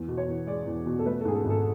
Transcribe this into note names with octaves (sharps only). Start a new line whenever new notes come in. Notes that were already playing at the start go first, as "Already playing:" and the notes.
Already playing: E2
B2
C#5
E2
G#3 D5
E2
B2
A4
A3 B4
A4
G#2 G#4
A4
G#1
A4